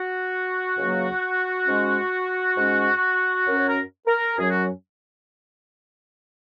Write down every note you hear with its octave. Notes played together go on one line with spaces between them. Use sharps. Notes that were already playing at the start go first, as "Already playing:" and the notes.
Already playing: F#4
C#2 C#3 F#3 A#3
G#2 G#3 C#4
G#2 G#3 C#4
F#2 F#3 C#4 A#4
C#5
A#4
A#4
F#2 F#3 C#4 G#4
F#4